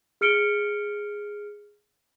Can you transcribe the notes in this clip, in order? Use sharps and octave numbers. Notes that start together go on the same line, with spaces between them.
G#4 F6 C#7 D7 G7